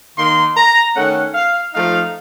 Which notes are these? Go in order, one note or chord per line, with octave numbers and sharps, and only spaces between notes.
D#3 A#3 D#4 C6
A#5
D#3 A3 C#4 F#5
F5
F3 A3 D#4 F5